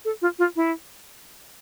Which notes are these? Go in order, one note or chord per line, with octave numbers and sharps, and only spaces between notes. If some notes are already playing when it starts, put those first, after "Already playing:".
A4
F4
F4
E4